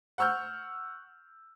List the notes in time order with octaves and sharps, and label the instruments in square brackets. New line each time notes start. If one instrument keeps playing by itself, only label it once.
[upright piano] F#5 C#6 E6 F6 G6